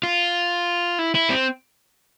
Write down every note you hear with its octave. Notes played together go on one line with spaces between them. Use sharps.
F4
E4
E4
C4